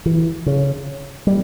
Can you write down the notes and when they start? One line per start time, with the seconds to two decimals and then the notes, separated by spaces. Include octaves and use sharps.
0.06 E3
0.46 C#3
1.27 G3